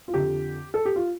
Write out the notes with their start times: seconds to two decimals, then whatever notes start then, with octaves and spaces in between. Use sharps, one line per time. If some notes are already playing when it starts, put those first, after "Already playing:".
0.08 F4
0.14 F2 D3 G4
0.74 A4
0.85 G4
0.96 F4